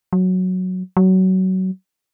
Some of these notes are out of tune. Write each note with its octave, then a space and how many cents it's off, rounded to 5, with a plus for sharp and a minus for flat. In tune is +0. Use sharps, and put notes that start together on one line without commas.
F#3 -5
F#3 +20